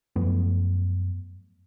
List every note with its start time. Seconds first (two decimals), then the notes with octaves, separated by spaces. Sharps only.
0.16 F#2 F3 A3 B3